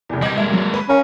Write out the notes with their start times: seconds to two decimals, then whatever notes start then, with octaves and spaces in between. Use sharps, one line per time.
0.09 F1 E2
0.22 C#2 G3 D#5 G#6
0.38 G2 G#3 A#3 E5
0.51 G2 F#3
0.74 B4
0.89 C#4 A#4 F5